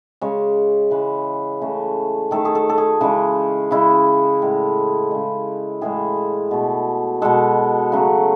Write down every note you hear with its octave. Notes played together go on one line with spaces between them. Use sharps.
C#3 G#3 C#5
C#3 E3 G#3 B4
C#3 E3 A3
D#3 A3 A4
G#4
A4
A4
G#4
C#3 E3 G#3
C#3 G#3 E4
A2 G#3
C#3 G#3
A2 E3 G#3 G#4
B2 A3
B2 G#3 A4
C#3 F#3 A3